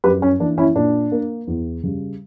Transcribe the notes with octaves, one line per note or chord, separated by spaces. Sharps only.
F#2 G4 B4
C#4
E3 A#3 D4
C#4 E4
A#2 D4
A#3
E2
C#3 G3